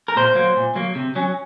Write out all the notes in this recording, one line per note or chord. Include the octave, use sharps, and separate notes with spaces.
A#4
A#2 C5
F#3 A#3
A#2
F#3 A#3
C3
F#3 C#4